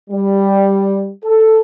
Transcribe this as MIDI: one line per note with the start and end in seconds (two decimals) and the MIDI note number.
0.10 1.09 55
1.25 1.60 69